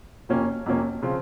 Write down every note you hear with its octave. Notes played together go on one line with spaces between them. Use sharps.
F2 C3 F3 A#3 C#4
F2 C3 F3 A#3 C#4
C#3 F3 C4 F4